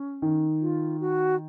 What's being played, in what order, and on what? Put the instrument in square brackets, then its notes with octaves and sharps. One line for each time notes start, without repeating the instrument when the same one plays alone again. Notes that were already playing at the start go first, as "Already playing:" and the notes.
Already playing: [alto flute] C#4
[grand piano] D#3
[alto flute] F4
F#4